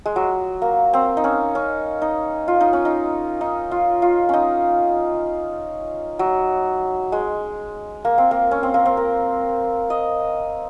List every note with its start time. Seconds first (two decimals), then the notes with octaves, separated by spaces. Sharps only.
0.06 G#3
0.16 F#3
0.62 A#3
0.93 C4
1.17 D#4
1.24 C#4
1.55 C#4
2.02 D#4
2.48 F4
2.61 D#4
2.73 C#4
2.85 D#4
3.41 D#4
3.71 F4
4.02 F4
4.29 C#4 D#4
6.19 F#3
7.12 G#3
8.05 A#3
8.18 C4
8.31 A#3
8.51 C#4
8.63 C4
8.74 A#3
8.85 C4
8.97 A#4
9.90 D#5